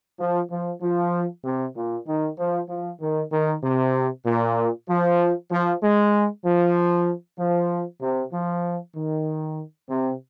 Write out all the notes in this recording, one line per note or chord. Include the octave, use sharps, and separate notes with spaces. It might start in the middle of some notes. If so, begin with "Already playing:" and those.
F3
F3
F3
C3
A#2
D#3
F3
F3
D#3
D#3
C3
A#2
F3
F3
G#3
F3
F3
C3
F3
D#3
C3